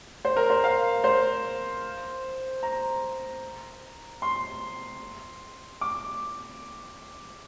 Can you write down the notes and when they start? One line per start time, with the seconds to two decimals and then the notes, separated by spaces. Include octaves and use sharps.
0.25 C5
0.36 A#4
0.50 C5
0.64 F5
1.04 C5
2.63 A#5
4.22 C6
5.81 D6